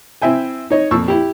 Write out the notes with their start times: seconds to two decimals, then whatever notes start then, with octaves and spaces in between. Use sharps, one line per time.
0.22 C4 E4 E5 G5 G#5
0.70 D#4 C#5 D#5
0.91 F2 A#2 C#6 E6
1.08 E4 G4